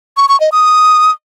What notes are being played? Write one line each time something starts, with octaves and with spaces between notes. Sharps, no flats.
C#6
C#6
D#5
D#6